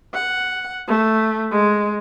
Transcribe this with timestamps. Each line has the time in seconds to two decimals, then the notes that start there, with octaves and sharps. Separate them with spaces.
0.14 F#5
0.88 A3
1.51 G#3